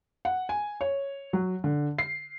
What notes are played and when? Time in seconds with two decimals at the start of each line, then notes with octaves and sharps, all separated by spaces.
0.25 F#5
0.49 G#5
0.81 C#5
1.33 F#3
1.64 D3
1.99 C7